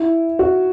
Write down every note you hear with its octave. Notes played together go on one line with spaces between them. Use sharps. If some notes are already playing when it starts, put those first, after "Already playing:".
Already playing: E4
F#4